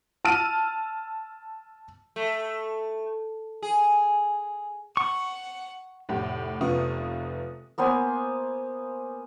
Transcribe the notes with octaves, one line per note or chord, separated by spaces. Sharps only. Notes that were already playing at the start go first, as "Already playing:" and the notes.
A5 E6 F6 D#7
A3
G#4
F#5 C#6
F1 A2 G4 F#5
F1 C3 B3 F4 C#6 D#6
A#3 B3 C5 G#5